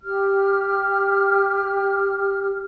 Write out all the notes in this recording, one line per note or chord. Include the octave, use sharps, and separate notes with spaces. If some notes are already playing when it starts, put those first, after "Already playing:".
G4 F6